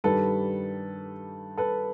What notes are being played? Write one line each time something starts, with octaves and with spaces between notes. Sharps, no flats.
G2 D#3 G3 A4 B4
A4 B4